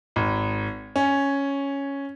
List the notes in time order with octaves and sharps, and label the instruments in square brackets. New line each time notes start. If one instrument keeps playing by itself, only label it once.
[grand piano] G#1
C#4